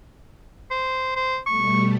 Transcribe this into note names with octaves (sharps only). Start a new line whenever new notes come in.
C5
C5
B2 G3 A3 C#6